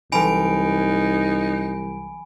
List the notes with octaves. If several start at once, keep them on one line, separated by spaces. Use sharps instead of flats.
C2 E3 F#3 D#4 G#5 B5 D7